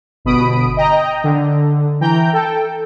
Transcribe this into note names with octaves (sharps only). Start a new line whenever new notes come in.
G1 B2 B5 D#6 D7
D#5 G5 A#5
D3
E3 G5 A#5 G6
A4 G5